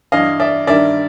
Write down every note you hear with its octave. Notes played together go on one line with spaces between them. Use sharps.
G2 E3 G3 D#5 F5
D5 E5
G2 D#3 G3 D5 E5